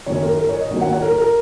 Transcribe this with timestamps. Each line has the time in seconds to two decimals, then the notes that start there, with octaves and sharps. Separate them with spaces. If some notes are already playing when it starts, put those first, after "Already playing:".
0.06 F#2 D#3 A#3 C#5
0.23 A#4
0.39 A#4
0.49 C#5
0.60 D#5
0.71 D#2 D#3 F#3 A#3 C#5
0.81 F#5
0.92 C#5
1.02 A#4
1.18 A#4